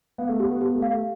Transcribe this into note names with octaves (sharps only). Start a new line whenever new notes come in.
B3 F5
A3
B3 G4
B3
B3 G4
A3
F5
A3